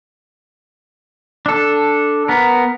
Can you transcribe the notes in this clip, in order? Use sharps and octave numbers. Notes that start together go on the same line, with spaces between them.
D4 A4
B3 A#4